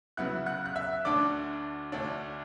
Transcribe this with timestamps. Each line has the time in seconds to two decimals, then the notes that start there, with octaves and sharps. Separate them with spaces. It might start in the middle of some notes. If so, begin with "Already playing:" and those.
0.17 C#3 F#3 B3 E4 F#5 F#6
0.46 F#5 F#6
0.66 F#6
0.76 E5 E6
1.05 D2 D3 A3 D4 D5 D6
1.92 D2 D3 A3 D4